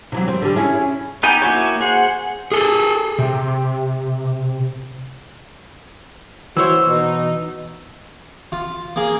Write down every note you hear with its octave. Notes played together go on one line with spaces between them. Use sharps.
C3 E3 F#3
C4
D3 G3
C#4 E4 G#4
B3 D#4 G4 G5 G#5
A#3 E4 F#4 G4 C#5
G#4 C5 F#5
G#4 A4
C3
E3 E4 F#4 C5 C#5 E6
B2 D#4
F4
A#3 G#4